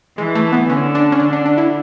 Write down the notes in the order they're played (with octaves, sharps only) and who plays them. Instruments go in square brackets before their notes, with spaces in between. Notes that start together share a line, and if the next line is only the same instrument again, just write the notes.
[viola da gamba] E3 [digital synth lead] G#3
[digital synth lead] A3
B3
[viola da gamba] D3 [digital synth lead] C#4
[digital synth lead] D4
C#4
[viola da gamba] D3 [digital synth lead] D4
[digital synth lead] D4
D4
E4